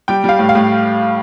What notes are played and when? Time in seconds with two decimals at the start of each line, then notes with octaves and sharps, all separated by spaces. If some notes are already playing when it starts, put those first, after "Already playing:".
0.08 G3 G5
0.24 G3 F5
0.39 A2
0.49 F5
0.55 A2